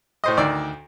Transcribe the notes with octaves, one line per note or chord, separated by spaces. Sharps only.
A2 C5 D#5
D2 D#3 D5 E6